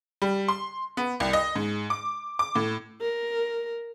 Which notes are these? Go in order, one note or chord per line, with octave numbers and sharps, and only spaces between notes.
G3
C6
B3
C2
D#5
G#2
D6
D6
A2
A#4